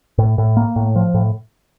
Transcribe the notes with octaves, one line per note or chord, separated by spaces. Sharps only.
A2
A2
A#3
A2
F3
A2